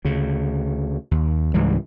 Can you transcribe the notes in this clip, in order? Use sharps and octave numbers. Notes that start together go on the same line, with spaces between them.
D2 C#3
D#2
C#2 G#2 E3 G3